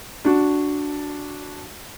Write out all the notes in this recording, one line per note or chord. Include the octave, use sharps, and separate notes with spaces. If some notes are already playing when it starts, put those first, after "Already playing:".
D4 F#4